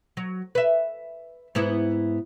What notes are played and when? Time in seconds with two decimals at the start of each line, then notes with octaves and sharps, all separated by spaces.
0.17 F#3
0.55 B4 E5
1.55 G#2 B3 E4